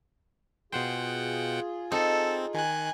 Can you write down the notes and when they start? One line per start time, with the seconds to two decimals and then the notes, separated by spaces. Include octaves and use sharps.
0.72 B2 F4 G#4 C5 F#5 G5
1.92 C4 D#4 A4
2.54 D#3 G#5 F#6